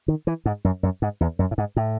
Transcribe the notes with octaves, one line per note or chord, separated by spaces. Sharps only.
D#3
E3
G#2
F#2
F#2
G#2
E2
F#2
A2
G#2
A2